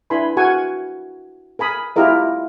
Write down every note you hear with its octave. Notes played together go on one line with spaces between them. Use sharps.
D4 E4 B4 G#5 B5 C6
F#4 A#4 F#5 G#5 C#6
A#4 G#5 B5 D#6
E4 F4 G4 A#4 D#5